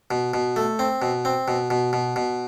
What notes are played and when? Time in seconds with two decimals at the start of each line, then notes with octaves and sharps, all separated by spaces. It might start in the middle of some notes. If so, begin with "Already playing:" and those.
0.11 B2
0.34 B2
0.56 A3
0.79 C4
1.02 B2
1.25 C4
1.48 B2
1.70 B2
1.93 B2
2.16 B2